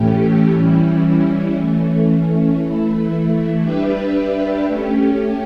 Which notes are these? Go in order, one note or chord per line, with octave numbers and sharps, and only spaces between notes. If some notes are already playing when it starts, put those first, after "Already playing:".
Already playing: A2 E3 A3 C#4 G4
E3 G3 C#4 E4
E3 A3 C#4
E3 A3 E4
G3 D4 G4 B4 E5
A3 C#4 G4